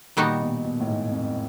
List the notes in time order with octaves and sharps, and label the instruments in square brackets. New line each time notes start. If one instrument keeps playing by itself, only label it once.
[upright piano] A#2 [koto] D#3 G3 B3 D#4 F#4
[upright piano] B2
B2
A2
G#2
F2